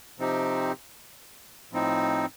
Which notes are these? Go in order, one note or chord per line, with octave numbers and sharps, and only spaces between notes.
C3 F3 C4 D#4 G4
A2 F3 C4 D#4